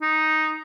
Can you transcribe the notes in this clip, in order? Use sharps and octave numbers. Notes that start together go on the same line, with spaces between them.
D#4